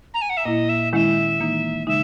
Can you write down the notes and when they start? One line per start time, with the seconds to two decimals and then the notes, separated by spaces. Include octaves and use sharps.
0.14 A#5
0.22 G#5
0.30 F#5
0.37 E5
0.45 A#2 A#3 E4 D#5
0.69 E5
0.93 D#3 G#3 C#4 E4 E5 F#5
1.40 E3 A#3 D#4
1.87 C#3 G#3 D#4 E5